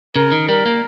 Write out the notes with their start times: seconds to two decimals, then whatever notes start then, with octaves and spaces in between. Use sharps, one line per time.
0.15 C#3 A#4
0.32 D#3
0.48 G3 A#4
0.66 A#3